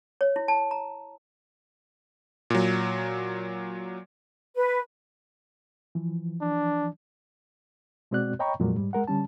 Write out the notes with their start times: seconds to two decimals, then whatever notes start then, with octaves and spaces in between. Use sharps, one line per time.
0.21 C#5
0.36 E4
0.48 A5
0.71 A#5
2.50 A#2 F#3
4.56 B4
5.95 E3 F3
6.41 D4
8.11 B2 G#3 C4 F#4 D5 F#6
8.39 C#5 D#5 G5 A#5 B5 C#6
8.60 F2 A#2 F#3 G#3 A#3
8.75 G#2 G3
8.93 G#3 A#4 F#5
9.08 D3 G3 C#4 A5